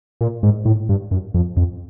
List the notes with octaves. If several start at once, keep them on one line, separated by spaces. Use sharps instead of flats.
A#2
G#2
A2
G2
F#2
F2
F2